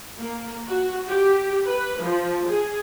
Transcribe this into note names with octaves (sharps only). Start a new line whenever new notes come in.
A#3
F#4
G4
B4
F3
G#4